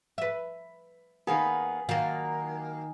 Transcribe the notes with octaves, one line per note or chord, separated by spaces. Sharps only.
B4 E5
D#3 A#3 B3 G#4 B5
D#3 F#3 A#3 F4